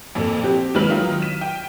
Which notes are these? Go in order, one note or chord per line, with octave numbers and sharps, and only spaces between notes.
F2 A#2 A4
C4 F#4 G4
D#2 F#3 G#3 B4 F6 F#7
D#3 F#3 D#4 F4
B6 D#7 E7
G5